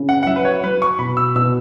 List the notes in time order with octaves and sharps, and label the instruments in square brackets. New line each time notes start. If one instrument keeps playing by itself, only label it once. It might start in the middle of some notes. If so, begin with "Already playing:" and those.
Already playing: [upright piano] C#3
[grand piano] F#5
F#5
[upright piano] F#3 [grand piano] E5
[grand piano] B4
C#5
[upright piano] F#3 [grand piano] B4
[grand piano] C#6
[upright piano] B2 [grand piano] B5
[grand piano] E6
[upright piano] B2 [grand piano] E6